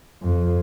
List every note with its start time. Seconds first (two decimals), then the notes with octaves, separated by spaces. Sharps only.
0.22 F2